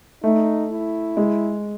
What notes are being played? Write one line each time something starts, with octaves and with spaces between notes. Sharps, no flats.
A3 D#4
E4
G#3